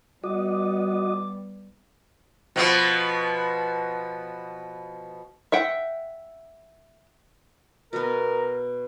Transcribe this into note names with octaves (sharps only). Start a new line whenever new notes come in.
G3 B3 F#4 D#5 D6
B2 F3 B3
E5 F#5 G5
B2 B3 A#4